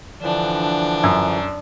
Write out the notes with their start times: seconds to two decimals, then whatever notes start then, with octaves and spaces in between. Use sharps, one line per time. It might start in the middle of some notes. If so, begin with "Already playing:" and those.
0.22 D3 E3 F3 D4
1.04 F#2